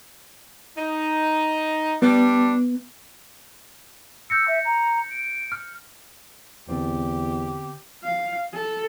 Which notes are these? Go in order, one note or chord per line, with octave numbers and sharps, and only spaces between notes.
D#4
G3 B3 D4
E6 G6 A#6 C#7
E5
A#5
D7
F6
E2 D3 B3 C4 G4
F5
A4